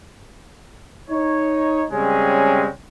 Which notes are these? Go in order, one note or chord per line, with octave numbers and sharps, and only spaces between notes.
D#4 C#5
C#3 G3 G#3 C4 C#4